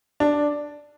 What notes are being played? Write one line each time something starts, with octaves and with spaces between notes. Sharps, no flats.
D4